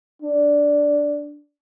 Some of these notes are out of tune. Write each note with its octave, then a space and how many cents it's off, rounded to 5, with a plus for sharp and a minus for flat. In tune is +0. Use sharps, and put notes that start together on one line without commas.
D4 -5